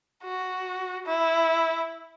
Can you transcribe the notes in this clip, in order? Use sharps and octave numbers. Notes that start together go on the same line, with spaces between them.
F#4
E4